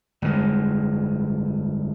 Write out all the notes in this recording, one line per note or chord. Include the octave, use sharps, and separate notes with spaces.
G1 F2 C3 G#3